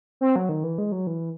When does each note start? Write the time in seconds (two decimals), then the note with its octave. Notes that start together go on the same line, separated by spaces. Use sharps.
0.21 C4
0.36 F#3
0.49 D#3
0.64 E3
0.78 G#3
0.92 F#3
1.07 E3